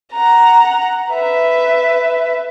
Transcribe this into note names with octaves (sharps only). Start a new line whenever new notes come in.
F#5 A#5
B4 E5